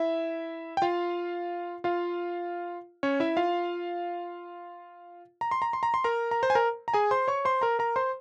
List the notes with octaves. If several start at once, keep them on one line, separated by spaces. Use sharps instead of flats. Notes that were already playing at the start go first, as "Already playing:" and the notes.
Already playing: E4 E5
G5
F4 F5
F4 F5
C#4 C#5
E4 E5
F4 F5
A#5
C6
A#5
C6
A#5
C6
A#4 A#5
A#5
C5 C6
G#5
A#4 A#5
A#5
G#4 G#5
C5 C6
C#5 C#6
C5 C6
A#4 A#5
A#4 A#5
C5 C6